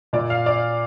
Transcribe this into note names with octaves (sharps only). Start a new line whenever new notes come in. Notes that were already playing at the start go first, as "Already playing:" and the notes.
A#2 D5
F5
D5